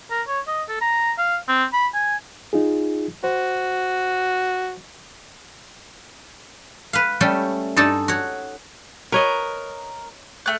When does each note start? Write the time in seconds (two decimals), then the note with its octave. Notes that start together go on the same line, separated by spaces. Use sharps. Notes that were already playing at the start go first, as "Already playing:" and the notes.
0.10 A#4
0.27 C#5
0.47 D#5
0.68 A4
0.81 A#5
1.18 F5
1.48 C4
1.73 B5
1.94 G#5
2.53 D#4 F4 G#4
3.24 F#4 C5
6.93 B4 F5
7.21 G3 A3 C#4 G5 A5
7.76 G2 D#4 A4 D5 G#5 A5
8.08 F#4 C#5
9.12 A#4 B4 C#5 D#5
10.46 A3 F#6